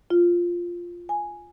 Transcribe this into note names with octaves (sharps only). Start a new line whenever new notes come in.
F4
G#5